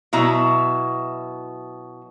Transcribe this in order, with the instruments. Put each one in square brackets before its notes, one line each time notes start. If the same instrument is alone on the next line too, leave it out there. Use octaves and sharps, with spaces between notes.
[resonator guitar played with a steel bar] B2 F#3 E4 A#5